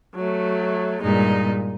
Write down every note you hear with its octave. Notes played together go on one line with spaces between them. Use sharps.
F#3 A3
G2 A#2 G#3 D#4